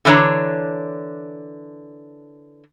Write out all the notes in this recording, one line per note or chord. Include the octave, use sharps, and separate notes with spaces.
D3 E3 D4 C#5 A#5